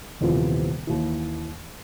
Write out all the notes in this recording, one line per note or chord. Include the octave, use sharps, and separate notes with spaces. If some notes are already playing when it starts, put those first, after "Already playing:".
D#1 C3 E3 F3 B3
D#2 E3